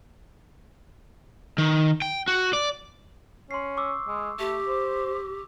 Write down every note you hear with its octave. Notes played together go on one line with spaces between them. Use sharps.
D#3
G5
F#4
D5
C#4 C6 C7
C#6 D6 E6
G#3
A3 G4
C5